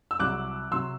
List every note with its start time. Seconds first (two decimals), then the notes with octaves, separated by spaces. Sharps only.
0.11 E6
0.19 C2 C3 F#3 D6 F#6
0.71 C3 F#3 C6 E6